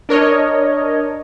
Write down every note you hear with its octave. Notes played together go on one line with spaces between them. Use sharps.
D4 A#4 C#5 D#5